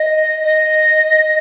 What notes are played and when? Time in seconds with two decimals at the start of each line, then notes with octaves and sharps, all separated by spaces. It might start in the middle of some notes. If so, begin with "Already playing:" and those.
Already playing: D#5
0.43 D#5